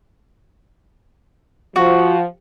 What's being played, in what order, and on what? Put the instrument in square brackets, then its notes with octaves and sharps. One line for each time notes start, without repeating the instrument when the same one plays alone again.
[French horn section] F3 [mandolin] F#4